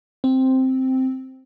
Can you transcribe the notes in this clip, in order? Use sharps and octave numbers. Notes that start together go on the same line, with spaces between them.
C4